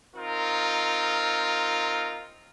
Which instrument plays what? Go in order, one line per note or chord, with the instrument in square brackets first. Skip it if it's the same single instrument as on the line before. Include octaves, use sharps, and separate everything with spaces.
[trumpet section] C4 D#4 F4 A#4